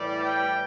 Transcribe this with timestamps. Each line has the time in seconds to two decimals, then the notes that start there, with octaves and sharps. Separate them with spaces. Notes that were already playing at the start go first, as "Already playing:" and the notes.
Already playing: A2 E3 G3 D5
0.26 G5